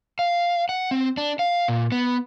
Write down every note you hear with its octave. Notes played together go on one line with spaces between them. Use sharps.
F5
F#5
C4
D4
F5
A#2
B3